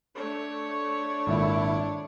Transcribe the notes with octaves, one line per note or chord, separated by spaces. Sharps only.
A3 D4 C#5
G#1 A#2 E4